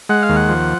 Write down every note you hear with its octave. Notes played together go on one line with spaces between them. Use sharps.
G#3 F#5
F5
D#2
F#5
F3